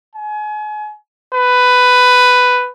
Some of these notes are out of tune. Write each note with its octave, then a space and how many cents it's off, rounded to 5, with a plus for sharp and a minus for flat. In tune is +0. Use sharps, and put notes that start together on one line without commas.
G#5 +35
B4 +10